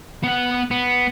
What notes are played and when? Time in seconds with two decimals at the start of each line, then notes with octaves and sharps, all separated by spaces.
0.23 B3 F#5
0.71 B3